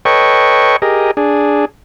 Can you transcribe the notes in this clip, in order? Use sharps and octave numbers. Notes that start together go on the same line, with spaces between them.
A4 B4 C#5 D#5 G5 C#6
G4 G#4 A#4 D#5
D4 G#4